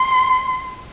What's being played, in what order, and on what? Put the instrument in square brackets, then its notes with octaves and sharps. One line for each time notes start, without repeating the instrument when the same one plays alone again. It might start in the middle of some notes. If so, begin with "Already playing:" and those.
Already playing: [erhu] C6